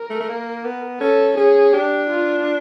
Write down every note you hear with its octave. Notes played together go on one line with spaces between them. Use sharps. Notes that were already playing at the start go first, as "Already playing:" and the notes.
Already playing: A#4
A3
A3
A#3
B3
C#4 A4
C#4 G#4
D4 G4
F4